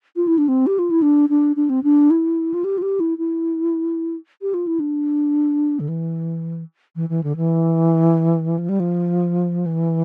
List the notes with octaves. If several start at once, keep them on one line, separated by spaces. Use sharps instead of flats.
F4
E4
D4
C4
G4
F4
E4
D4
D4
D4
C4
D4
E4
F4
G4
F4
G4
E4
E4
G4
F4
E4
D4
D3
E3
E3
E3
D3
E3
F3
G3
F3
E3